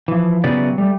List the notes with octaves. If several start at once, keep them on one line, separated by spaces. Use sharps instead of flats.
E3 F3
C#3 F#3 B3 E4 G4 D5
G3 A3